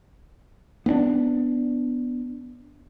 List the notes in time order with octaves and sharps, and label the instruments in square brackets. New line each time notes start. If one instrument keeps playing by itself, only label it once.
[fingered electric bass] B3 C4 D4